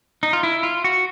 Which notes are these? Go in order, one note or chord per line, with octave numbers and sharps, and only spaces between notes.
D#4
F4
E4
F4
F#4